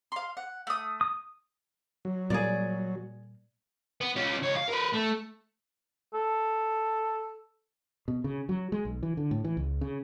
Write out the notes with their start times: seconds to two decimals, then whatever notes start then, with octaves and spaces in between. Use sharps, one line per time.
0.12 F5 C6
0.37 F#5
0.67 A3 D#6
1.01 D#6
2.05 F#3
2.30 A#2 G3 A#3 G#4 D5
4.01 B3
4.16 C#4 F4
4.43 C#2 C#5
4.57 F5
4.69 A#4 B4
4.94 A3
6.14 A4
8.08 B2
8.24 C#3
8.49 F#3
8.72 G#3
8.85 B1
9.03 E3
9.17 D3
9.31 A2
9.44 E3
9.57 C#2
9.81 C#3